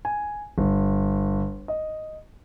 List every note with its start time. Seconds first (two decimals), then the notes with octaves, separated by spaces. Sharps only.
0.05 G#5
0.58 G1
1.68 D#5